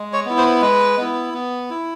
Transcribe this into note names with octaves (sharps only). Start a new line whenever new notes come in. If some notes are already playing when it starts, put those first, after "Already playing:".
Already playing: G#3
C#5
B3 E4
C5
G#3 B4
B3 E4
B3
E4